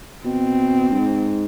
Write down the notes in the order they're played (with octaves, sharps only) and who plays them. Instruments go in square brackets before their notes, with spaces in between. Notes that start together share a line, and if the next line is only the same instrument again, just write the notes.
[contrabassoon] B2 [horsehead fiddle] C4
[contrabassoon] G2
G#2